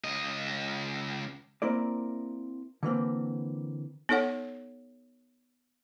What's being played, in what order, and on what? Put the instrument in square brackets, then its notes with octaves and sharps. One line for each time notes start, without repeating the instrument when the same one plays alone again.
[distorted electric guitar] C#2 D#5
[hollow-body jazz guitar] A#3 C4 E4 A#4 D5
D3 E3 A#3 C4
[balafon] B3 D#4 A4 C#5 F#5